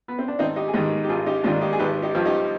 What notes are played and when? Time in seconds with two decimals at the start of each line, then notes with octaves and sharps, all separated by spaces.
0.08 B3
0.19 C4
0.28 D4
0.39 G#1 C4 D#4
0.56 D#4 G4
0.68 G#4
0.73 G#2 D#4 G4
0.78 D#3
1.04 G4
1.09 G#1 F4 G#4
1.26 D#4 G4
1.44 G#2 D#3 D4 F4
1.61 D#4 G4
1.73 G#4
1.79 G#1 G4 B4
2.02 D#4 G4
2.15 G2 F3
2.26 D#4 G4